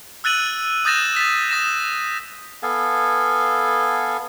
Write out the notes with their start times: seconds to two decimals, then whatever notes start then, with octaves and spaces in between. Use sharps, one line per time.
0.24 E6 F#6 A6 D#7 F#7
0.85 D#6 G6 A6 A#6 E7
1.16 A6 B6
1.50 D#6 A#6 E7
2.63 B3 A4 F5 G#5